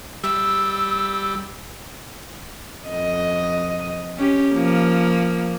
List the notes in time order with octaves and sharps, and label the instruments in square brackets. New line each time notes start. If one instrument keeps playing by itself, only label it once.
[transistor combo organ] G3 [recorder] E6
[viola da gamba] F2 D#5
C#4 G4
F3 A#3